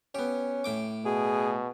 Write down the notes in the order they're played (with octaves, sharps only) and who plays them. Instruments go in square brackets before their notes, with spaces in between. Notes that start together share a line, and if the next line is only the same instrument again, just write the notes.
[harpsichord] B3 G4 [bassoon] C#4
[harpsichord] A2 G5 D6
[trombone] B2 [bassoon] G#4